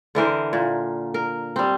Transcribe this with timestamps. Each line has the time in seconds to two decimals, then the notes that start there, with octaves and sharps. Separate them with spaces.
0.15 D3 E3 A#4 C5
0.53 A#2
1.14 A#4
1.56 G3 C4